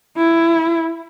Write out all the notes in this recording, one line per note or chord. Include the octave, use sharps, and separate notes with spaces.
E4